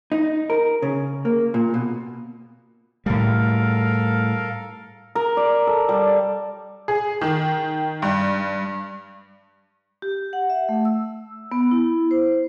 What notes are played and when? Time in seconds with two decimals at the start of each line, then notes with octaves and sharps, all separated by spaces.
0.12 D#4
0.50 A#4
0.82 C#3
1.25 A#3
1.54 A#2
1.74 B2
3.06 A2 G3 A4 A#4 F5
5.15 A#4
5.37 D5
5.67 A4
5.89 G3
6.88 G#4
7.21 D#3
8.02 G2
10.02 G4
10.33 F#5
10.50 E5
10.69 A3
10.85 E6
11.52 B3
11.71 E4
12.11 C5